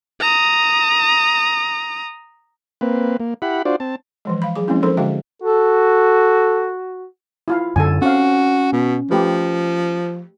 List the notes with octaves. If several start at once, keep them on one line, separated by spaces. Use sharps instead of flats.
A#5 D#6
A#3 C4 B4
A#3
E4 G4 F#5 B5
D4 F4 F#4 C5 D5
C4 A5
E3 F3 G#3
F5 B5
F#3 G#4 D6
F3 G#3 A#3 C4 C#4 E4
F3 D#4 A4 A#4 C5 C6
D3 G#3 F#4 E5 F5 G5
F#4 A4
E4 F4 F5
F#2 D3 A4 G#5
C4 C#4 F#4 F5
B2
F3 A3 G4 B4